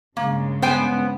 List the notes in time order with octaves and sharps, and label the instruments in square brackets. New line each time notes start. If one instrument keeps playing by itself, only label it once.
[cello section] G2 C#3 G#3 [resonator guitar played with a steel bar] A#3
[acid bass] B3 [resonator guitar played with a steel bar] C5 G5 G#5